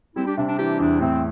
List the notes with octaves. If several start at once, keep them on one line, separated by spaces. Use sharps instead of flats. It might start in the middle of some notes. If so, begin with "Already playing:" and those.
G3 C4 E4
D4 G4
C3 D4
D4
E3 D4 G4
E2 D4
A2 C4